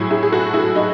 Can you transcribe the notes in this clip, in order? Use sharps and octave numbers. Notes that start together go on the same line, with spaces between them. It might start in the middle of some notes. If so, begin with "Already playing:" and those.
Already playing: A2 F#3 E4 G#4
E4 G#4
G#4
F#4 A4
E4 G#4
D#4 F#4